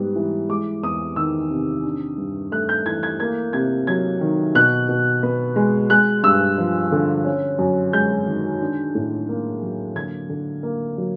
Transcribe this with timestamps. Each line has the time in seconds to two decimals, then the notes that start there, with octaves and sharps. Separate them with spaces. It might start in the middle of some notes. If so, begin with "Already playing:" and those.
Already playing: G#2 G3 B3
0.16 E3
0.49 G#3 D6
0.83 E2 D#6
1.16 D#3 E6
1.50 C3
1.85 D4
2.18 G2
2.52 A3 F#6
2.69 G6
2.86 E3 G#6
3.03 G#6
3.20 A#3 G#6
3.53 C3 G#6
3.87 F#3 G#6
4.20 D#3
4.55 B2 F#6
4.89 B2
5.23 B3
5.56 G#3
5.90 G#3 F#6
6.23 G2 E6
6.58 F3
6.92 D3
7.25 C#4
7.59 F#2
7.93 G#3 G6
8.26 D#3
8.61 D4
8.95 A2
9.29 A#3
9.62 F#3
9.96 D3 G#6
10.29 D3
10.63 A#3
10.98 F#3